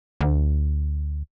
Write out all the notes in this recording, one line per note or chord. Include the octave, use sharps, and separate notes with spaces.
D2